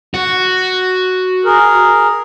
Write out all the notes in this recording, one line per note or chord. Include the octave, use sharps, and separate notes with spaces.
F#4
G#4 A#4